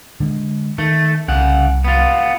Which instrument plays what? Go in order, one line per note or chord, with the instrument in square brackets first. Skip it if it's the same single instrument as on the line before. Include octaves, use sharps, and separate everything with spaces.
[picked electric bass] D3 G#3
[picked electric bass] D#3 [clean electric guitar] A3
[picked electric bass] C2 [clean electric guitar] C#3 F#5
[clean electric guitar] B3 F4